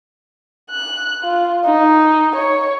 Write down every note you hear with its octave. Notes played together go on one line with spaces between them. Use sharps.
F#6
F4
D#4
C#5